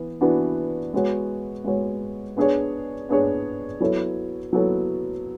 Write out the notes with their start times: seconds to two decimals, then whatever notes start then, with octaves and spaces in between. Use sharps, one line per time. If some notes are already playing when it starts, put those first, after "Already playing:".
Already playing: E3 B3
0.21 E3 B3 D4 F#4
0.94 G#3 B3 F#4 C#5
1.64 G#3 B3 F#4 C#5
2.37 B3 D4 G#4 C#5
3.09 B3 D4 G#4 C#5
3.80 F#3 B3 E4 A4 C#5
4.53 F#3 B3 E4 A4 C#5